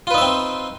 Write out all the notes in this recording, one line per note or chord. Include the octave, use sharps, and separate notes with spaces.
C4 D#4 F4 B4 E5